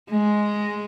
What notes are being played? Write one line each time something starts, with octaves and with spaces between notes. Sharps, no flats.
G#3